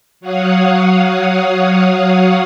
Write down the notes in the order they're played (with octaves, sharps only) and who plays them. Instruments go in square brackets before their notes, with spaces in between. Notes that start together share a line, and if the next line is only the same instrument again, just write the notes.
[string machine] F#3 C#5 F5 F#5 D#6